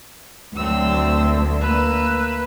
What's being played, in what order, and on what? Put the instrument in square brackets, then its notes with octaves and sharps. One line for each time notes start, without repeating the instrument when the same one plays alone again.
[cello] D2 [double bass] F#3 A3 [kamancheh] C4 E6
[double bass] A3
[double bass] A#3 [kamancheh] B4 E6